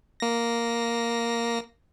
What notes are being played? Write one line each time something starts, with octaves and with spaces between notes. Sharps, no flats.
A#3 A#6